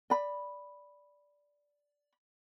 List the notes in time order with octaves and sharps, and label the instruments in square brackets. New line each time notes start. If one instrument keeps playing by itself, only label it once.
[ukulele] D5 B5